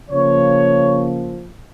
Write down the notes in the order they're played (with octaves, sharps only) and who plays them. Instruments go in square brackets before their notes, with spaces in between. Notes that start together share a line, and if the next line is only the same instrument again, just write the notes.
[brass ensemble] C#3 F3 A#3 C#5